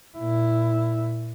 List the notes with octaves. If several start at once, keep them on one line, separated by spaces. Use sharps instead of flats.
A#2 E4